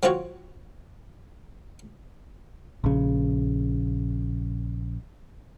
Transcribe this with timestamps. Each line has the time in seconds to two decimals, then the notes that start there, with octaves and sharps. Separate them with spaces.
0.03 F#3 C4 F4 F#4 C#5
2.84 A#1 C#3